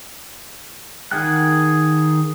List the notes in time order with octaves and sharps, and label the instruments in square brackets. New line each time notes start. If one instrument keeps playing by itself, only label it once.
[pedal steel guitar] D#3 G#4 F#5 G5 F#6